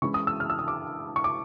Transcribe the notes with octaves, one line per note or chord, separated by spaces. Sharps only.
E3 G#3 C#4 E4 C#6
D#6
E6
F6
E6
D#6
D6
C#6
D6